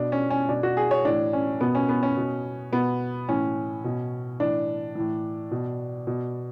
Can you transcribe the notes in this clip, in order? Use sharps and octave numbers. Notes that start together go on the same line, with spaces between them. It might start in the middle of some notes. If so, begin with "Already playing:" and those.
Already playing: B2 D4
C#4
C#4
B2 D4
F#4
G#4
C#5
A2 E3 D4
C#4
B2 B3
C#4
B3
C#4
B2
B2 B3
A2 E3 C#4
B2
A2 E3 D4
A2 E3
B2
B2